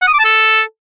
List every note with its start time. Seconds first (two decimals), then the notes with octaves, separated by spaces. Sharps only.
0.02 F#5
0.08 D#6
0.13 D6
0.19 A5
0.25 A4